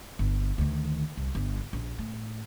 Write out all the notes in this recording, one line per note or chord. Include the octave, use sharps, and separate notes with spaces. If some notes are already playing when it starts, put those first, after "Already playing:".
G1
D2 D#3
C2
G1
A#1
A2